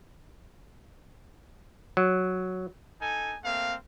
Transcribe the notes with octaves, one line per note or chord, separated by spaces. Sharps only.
F#3
D#4 A4 G#5
A3 A#3 C4 F5